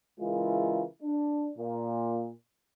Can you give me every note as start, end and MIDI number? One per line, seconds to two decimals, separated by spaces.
0.20 0.84 49
0.20 0.84 52
0.20 0.84 56
0.20 0.84 64
0.20 0.84 65
0.20 0.84 70
1.03 1.49 62
1.57 2.28 46